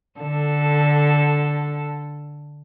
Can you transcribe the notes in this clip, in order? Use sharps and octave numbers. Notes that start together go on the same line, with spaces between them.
D3 A4